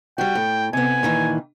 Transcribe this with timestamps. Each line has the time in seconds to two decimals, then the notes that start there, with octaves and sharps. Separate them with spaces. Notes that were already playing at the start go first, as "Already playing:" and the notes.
0.18 G3 F#4 G5
0.35 A2
0.73 C3 B3 G#5
1.03 A#2 D#3 E3